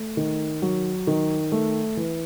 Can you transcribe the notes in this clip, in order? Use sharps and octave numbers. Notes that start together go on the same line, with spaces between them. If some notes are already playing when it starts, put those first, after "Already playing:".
Already playing: A3
D#3
F#3
D#3
A3
E3